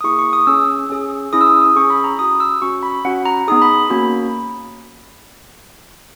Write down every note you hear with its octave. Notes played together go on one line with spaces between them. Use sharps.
D#6
A#3 E4 G#4 C#6
C#6
D#6
C#4 G#4 E6
C#4 G#4
C#4 E4 G#4 D#6
E6
D#6
D#6
C#4 G#4 C#6
B5
A#5
C#4 F#4 D#6
E6
C#4 F#4 C#6
B5
C#4 F#4 F#5
A#5
B3 D#4 G#4 D#6
B5
A#3 C#4 F#4 B5